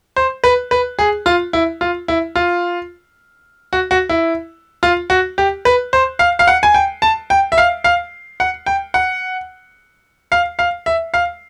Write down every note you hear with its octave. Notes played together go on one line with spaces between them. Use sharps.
C5
B4
B4
G#4
F4
E4
F4
E4
F4
F#4
F#4
E4
F4
F#4
G4
B4
C5
F5
F5
F#5
G#5
G5
A5
G5
E5
F5
F5
F#5
G5
F#5
F5
F5
E5
F5